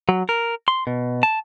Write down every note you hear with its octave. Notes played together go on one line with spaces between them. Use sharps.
F#3
A#4
C6
B2
A5